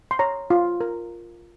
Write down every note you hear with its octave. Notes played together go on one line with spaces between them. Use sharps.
C6
C#5 A#5
F4
A#4